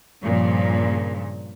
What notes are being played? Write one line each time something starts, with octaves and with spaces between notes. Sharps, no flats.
G2 A#2 C#3 F3